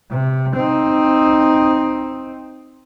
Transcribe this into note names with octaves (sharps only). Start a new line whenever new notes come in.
C3
C4 D#4